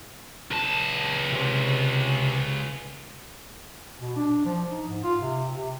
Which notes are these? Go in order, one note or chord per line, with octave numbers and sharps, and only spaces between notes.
C#2 A5
C3
B2
D4
F3
D#4
G#2
F4
C3
C3